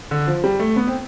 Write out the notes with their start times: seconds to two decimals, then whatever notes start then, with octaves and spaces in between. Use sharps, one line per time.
0.11 D3
0.27 F3
0.44 G3
0.59 A3
0.76 B3
0.88 C4